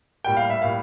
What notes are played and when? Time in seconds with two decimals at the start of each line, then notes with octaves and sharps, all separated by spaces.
0.24 A2 G3 A#3 G5
0.37 F5
0.50 E5
0.61 A2 G3 A#3 F5